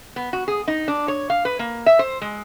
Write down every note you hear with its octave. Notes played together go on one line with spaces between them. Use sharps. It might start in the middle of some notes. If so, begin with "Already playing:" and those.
B3
F#4
G#4
D#4
D4
C#5
F5
B4
A#3
E5
C5
G#3